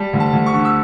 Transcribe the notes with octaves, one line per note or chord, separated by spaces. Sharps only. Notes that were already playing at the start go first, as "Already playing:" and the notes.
Already playing: G3 A5
D2
A5
D2
C#6
D3
E6